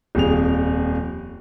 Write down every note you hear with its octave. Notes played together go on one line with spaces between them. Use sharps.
D#1 F2 G#4 F7